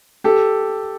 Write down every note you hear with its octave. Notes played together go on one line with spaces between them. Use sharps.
G4 A4